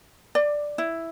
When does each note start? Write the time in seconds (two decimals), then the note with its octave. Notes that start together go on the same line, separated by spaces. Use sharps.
0.35 D5
0.78 E4